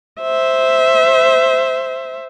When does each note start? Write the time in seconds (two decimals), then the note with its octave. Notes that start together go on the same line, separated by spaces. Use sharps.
0.21 C5 E5